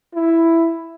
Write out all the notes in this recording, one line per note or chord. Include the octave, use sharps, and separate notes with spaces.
E4